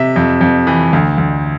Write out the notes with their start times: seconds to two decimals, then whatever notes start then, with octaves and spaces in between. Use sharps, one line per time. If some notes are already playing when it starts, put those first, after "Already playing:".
Already playing: C3 E5
0.16 F2
0.41 F2
0.67 E3
0.93 D2
1.18 D2